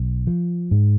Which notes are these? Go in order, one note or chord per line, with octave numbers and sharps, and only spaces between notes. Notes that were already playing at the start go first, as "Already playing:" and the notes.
Already playing: B1
F3
G#2